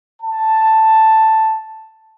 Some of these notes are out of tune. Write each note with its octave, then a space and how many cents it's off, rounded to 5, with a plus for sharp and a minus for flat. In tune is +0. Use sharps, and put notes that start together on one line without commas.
A5 +5